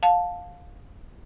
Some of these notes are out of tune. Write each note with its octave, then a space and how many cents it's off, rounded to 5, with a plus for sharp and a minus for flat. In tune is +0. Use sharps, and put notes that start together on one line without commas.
F5 +20 A5 -5